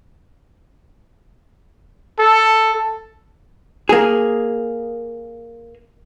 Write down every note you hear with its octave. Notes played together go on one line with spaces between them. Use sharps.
A4
A#3 G#4